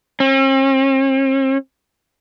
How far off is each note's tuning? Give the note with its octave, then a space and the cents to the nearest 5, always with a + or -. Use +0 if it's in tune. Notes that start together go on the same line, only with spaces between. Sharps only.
C4 +45